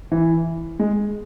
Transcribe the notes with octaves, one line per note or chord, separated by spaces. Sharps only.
E3
G#3